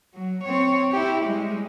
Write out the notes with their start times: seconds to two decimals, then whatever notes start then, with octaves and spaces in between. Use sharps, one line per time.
0.14 F#3
0.44 C4 C#5
0.92 E4 G4
1.25 G3 G#3